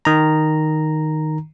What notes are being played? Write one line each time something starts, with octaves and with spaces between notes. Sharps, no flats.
D#3 A#5